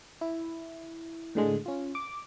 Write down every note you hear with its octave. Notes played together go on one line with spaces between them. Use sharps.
E4
A2 D3 G#3
C#4 F4
D6